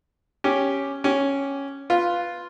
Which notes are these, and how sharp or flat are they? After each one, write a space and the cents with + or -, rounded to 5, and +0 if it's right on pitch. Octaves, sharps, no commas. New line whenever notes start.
C#4 +0 G4 +0
C#4 +0 G4 -15
F4 +0 B4 +0